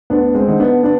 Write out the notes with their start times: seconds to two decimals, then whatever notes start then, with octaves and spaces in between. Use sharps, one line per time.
0.10 D2 B3 D4
0.35 G#3 C4
0.48 D3 D#4
0.59 B3 D4
0.83 B3 D4